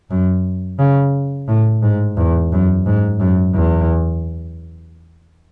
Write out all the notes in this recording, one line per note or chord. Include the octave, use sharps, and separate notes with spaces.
F#2
C#3
A2
G#2
E2
F#2
G#2
F#2
E2